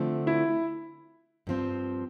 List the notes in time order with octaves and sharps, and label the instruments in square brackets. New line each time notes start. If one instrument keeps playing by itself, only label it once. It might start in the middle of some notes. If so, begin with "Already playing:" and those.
Already playing: [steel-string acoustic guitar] D3 F3 A3 C4
[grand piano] E4
[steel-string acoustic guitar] G2 F3 C4